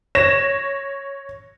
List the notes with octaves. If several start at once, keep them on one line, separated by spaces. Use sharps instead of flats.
C#5 A#6 E7